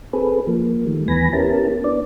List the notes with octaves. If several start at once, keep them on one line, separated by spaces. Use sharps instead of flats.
C4 G#4 A4 B4
F3 A#3
D#3 G3 A3
D#2 E3 B3 G#5 B5 A#6
B3 C#4 E4 G4 A#4 A5
B3 D4 D5